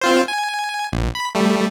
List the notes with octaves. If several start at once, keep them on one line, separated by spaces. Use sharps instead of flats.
C4 F4 C5
G#5
A#1
B5
G3 A3